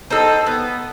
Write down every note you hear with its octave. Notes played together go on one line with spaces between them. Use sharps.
C4 D#4 A4
B3